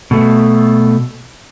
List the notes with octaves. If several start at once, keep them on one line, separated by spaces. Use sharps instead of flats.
B2 A3